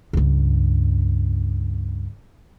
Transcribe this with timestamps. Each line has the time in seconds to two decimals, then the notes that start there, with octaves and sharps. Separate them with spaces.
0.13 C#2 G2